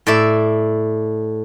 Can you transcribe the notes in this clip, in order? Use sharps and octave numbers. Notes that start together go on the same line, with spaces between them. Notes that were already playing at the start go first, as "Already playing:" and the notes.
A2 D5 E5